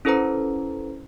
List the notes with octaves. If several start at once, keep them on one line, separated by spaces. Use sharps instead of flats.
C#4 E4 A4 B4 C5 A#5